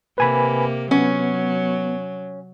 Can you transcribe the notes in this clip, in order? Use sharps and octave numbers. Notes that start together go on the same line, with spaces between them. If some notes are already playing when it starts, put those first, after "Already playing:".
C3 A#3 B4 G#5 B5
F#3 B3 C#4